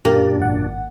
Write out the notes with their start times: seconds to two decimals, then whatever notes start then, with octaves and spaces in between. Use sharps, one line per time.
0.05 F#2 A#2 A#3 D4 G4
0.40 G#1 F#5